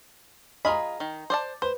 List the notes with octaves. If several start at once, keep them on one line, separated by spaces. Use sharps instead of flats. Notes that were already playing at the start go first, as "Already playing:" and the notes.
F4 G#4 D#5 A#5 B5
D#3
C5 D5 A5
B4 C5